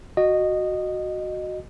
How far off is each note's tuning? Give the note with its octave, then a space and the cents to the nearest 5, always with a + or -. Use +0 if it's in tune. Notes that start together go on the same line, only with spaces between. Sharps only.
F#4 +0 D#5 -15